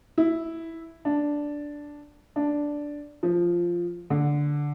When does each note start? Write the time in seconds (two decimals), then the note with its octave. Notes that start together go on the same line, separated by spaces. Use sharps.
0.18 E4
1.05 D4
2.36 D4
3.23 F3
4.10 D3